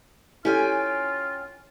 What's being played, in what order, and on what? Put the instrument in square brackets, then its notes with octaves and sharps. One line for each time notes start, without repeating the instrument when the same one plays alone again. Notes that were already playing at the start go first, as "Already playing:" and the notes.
[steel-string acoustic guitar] C#4 G5 G#5 [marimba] E4 G4 A4 [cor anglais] F4